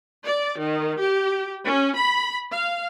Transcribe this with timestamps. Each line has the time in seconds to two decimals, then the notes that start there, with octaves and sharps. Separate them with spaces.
0.23 D5
0.58 D#3
0.98 G4
1.65 C#4
1.96 B5
2.52 F5